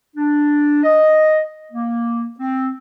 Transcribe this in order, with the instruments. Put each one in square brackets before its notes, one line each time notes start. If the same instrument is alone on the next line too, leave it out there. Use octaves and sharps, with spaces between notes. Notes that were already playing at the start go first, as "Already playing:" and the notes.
[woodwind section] D4
D#5
A#3
C4